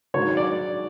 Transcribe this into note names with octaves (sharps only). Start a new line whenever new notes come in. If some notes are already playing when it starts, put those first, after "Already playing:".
G#2 D#3 F#3 C#5
D5